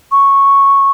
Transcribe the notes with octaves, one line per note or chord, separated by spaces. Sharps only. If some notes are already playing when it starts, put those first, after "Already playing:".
C#6